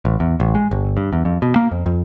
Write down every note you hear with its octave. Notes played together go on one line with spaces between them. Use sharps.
A1
E2
A1
G#3
G1
G2
E2
F2
B2
A#3
F2
F2